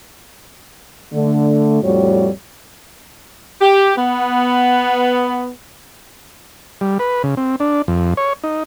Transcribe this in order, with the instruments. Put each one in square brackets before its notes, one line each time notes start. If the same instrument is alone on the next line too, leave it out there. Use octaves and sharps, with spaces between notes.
[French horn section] D3 A3
F2 A2 G3 F#4 C#5
[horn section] G4
B3
[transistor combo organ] G3
B4
C#3
C4
D4
F2
C#5
D#4